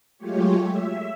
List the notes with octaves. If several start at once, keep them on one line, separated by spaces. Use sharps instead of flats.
F#3 G#3 A3 F4 G4 C#5
E5